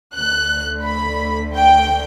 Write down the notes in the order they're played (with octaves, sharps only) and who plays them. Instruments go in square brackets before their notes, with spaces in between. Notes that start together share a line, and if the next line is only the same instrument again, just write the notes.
[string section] D2 D3 A3 F#6
B5
G5